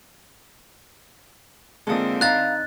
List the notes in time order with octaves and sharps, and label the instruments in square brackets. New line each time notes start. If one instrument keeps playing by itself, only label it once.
[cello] D3 C4 [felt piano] G#3 A#3 F4 [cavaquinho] A4 D#6
[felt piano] D#4 [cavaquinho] F5 A#5 B5 [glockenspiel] F#6 A6